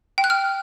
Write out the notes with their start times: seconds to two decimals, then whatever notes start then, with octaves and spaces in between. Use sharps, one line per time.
0.18 G5
0.24 F#6
0.30 F6